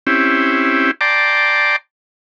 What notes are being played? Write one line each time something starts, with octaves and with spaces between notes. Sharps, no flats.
C4 C#4 E4 G4
D5 G5 A5 A#5 C6 D6